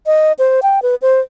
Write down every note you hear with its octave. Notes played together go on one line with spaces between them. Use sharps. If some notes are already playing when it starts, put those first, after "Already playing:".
D#5
C5
G5
B4
C5